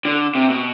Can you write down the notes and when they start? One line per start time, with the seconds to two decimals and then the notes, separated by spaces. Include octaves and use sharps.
0.05 D3
0.35 C3
0.50 B2